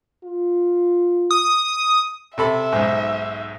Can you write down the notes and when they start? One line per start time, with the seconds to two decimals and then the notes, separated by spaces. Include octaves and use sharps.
0.24 F4
1.31 D#6
2.38 C3 A4 E5 B5
2.72 B1 G#2